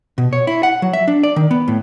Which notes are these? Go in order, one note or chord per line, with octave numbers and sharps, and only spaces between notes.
B2
C#5
E4
F#5
F#3
E5
D4
D5
D#3
B3
A2